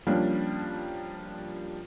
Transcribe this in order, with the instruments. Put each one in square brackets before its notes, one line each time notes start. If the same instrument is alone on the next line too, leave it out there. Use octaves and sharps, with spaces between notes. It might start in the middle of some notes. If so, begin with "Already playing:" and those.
[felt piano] F3 G3 A#3 C#4 D4 F5